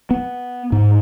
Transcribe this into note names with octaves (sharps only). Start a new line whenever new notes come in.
B3
G#2